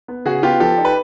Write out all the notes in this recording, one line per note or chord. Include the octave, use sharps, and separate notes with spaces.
B3
C#3 F#4 G#4
B3 F4 G4
F3 G4 A4
D#4
B4